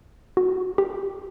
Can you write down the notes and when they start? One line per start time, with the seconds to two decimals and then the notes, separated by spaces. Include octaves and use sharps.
0.37 F#4
0.78 G4